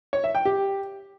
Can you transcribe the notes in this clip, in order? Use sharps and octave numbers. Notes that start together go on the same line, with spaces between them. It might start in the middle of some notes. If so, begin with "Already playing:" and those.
C#5
E5
G5
G4